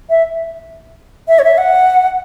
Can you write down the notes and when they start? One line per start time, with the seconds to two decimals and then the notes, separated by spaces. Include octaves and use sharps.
0.10 E5
1.28 E5
1.39 C#5
1.44 E5
1.58 F#5